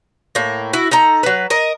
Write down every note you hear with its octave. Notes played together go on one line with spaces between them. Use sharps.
A2 A#3
E4 F#4
D#4 A4 A#5
F#3 B4
A#4 D#5